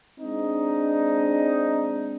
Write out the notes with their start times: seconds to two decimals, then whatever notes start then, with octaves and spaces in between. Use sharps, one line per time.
0.20 G#3 C4 D4 D#4